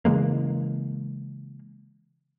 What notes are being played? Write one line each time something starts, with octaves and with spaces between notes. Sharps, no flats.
C#3 E3 G#3 A#3